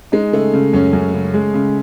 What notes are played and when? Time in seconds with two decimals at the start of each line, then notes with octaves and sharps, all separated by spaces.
0.12 G#3 D#4
0.32 C#3 A3
0.54 C#3
0.73 F#2 C#4
0.93 F#2
1.14 C#3
1.34 G#3
1.54 C#3